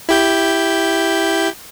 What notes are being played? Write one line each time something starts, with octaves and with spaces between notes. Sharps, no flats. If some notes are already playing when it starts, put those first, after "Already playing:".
E4 G4 G6